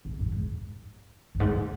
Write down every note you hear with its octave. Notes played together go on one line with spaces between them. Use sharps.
A#2
F#2
G#2
F#2
G#2
F#2